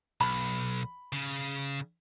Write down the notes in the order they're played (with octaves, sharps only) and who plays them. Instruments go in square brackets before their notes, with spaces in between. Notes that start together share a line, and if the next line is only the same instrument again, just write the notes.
[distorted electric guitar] B1 [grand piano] B5
[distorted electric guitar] C#3